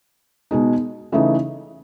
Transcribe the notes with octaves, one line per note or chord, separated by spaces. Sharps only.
B2 G#3 D#4
C#3 E3 A3 D#4